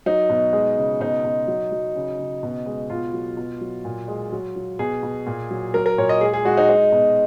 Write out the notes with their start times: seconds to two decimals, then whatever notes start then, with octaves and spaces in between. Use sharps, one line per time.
0.06 F#3 D#4
0.30 B2
0.53 G#3
0.77 C#3
1.01 B2 D#4
1.24 B2
1.48 F#3
1.72 F#3
1.96 C#3
2.19 C#3
2.43 B2
2.66 G#3
2.90 B2 F4
3.13 F#3
3.37 B2
3.61 F#3
3.85 A#2
4.08 G#3
4.32 F#3
4.56 F#3
4.79 B2 G#4
5.03 B2
5.26 A#2
5.51 F#3
5.74 F#3 A#4
5.86 A#4
5.98 A#2 C#5
6.09 D#5
6.21 G#3 G#4
6.33 G#4
6.45 G#3 F#4
6.57 D#4
6.69 G#3 D#4
6.92 B2